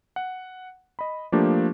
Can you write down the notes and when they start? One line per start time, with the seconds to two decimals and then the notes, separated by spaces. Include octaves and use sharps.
0.16 F#5
0.99 D#5 B5
1.32 F3 A3 A#3 D4 G4